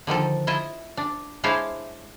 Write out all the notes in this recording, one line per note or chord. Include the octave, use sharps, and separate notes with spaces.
D3 D#3 F3 A4
E4 F4 D#5 E5
D4
G#3 D4 E4 C5 C#5 F5